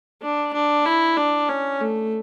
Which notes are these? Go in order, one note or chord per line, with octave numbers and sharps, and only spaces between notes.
D4
D4
E4
D4
C#4
A3